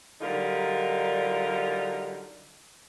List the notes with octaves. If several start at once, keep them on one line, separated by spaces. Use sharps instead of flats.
D3 F#3 G3 D#4 F4 A#4